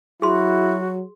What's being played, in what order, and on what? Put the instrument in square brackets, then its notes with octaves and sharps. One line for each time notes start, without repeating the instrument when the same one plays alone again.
[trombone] F#3 [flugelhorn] E4 [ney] F#4 [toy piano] G#4 C6